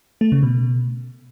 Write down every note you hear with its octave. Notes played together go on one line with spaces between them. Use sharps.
A3
C#3
B2